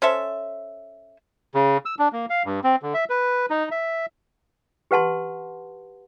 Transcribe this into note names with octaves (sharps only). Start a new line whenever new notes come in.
C#4 A4 C5 E5
C#3
E6
D4
A#3
F5
G2
C4
D3
E5
B4
D#4
E5
G4 B4 F#5 A5 C6